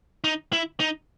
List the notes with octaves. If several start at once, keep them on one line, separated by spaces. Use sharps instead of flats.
D#4
E4
D#4